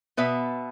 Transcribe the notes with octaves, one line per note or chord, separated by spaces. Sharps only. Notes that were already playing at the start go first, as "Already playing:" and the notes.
B2 B3 B4 E5